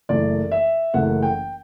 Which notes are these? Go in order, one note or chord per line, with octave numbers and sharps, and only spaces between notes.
F#1 F#2 E3 A3 D5
E5
F#1 F#2 E3 A3 F#5
G5